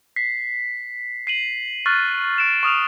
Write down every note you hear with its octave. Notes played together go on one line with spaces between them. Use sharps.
B6 C7
C7 D#7 F#7
C#6 F6 F#6 A6
F6 D7 E7
C#6 D#6 F6 F7